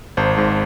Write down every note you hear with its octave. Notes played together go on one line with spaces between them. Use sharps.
G#1 C5
G#2